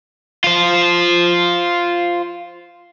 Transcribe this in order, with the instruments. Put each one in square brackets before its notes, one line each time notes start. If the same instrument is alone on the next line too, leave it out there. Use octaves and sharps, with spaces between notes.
[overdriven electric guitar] F4 C5